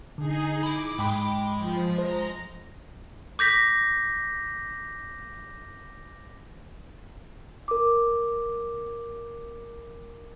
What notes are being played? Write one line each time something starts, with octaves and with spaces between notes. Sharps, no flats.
D3 D#4 G#4
E4 B5 D6
G#2 G#3 G5 B5
F3
C5 A#5
D6 G6 A#6 B6
A#4 D6